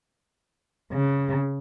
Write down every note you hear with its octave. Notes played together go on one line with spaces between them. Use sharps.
C#3